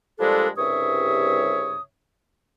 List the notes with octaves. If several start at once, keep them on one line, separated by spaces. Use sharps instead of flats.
A#2 F3 G3 G#3 D4 A4
C2 G2 C#3 C#5 E5 D#6